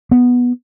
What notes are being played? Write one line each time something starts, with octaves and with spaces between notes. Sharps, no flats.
B3